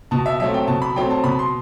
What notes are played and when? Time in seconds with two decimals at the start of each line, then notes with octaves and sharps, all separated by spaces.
0.11 B2 A5
0.26 E5
0.40 F#3 A3 C4 E5
0.54 G5
0.67 B2 A5
0.82 B5
0.96 F#3 A3 C4 G5
1.10 A5
1.24 B2 B5
1.39 C6